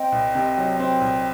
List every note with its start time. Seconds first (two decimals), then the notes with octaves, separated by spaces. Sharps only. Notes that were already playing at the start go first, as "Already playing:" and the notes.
Already playing: C4 D#5 G5
0.12 C2
0.35 C3
0.58 F#3
0.79 C4 D#5 G5
1.01 C2